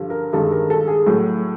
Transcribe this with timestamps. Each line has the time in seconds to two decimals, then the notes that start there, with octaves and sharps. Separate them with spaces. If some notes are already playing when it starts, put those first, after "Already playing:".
Already playing: G2 D3 F3
0.10 A#4
0.33 G2 D#3 G#3 A4
0.52 A#4
0.70 A4
0.88 G#4
1.07 A2 F#3